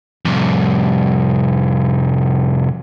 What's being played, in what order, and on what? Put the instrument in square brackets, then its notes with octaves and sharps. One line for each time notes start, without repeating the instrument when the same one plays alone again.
[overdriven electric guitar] C2 F2